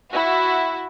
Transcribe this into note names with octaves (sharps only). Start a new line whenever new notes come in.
E4 F#4